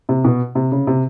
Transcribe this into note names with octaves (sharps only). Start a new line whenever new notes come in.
C3
B2
C3
C#3
C3